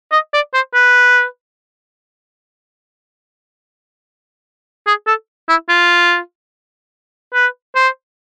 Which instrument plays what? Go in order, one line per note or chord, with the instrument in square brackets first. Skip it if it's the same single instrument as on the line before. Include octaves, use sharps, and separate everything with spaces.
[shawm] D#5
D5
C5
B4
G#4
A4
E4
F4
B4
C5